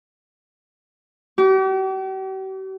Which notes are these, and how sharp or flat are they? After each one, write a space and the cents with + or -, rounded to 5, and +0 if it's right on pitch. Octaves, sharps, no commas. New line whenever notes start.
G4 -45 D6 -35